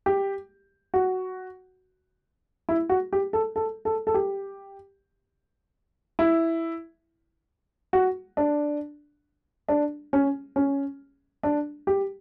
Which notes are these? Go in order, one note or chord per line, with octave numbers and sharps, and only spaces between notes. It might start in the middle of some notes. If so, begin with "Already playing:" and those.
G4
F#4
E4
F#4
G4
A4
A4
A4
A4
G4
E4
F#4
D4
D4
C#4
C#4
D4
G4